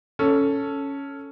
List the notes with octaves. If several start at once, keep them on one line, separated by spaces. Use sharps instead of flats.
C#4 A4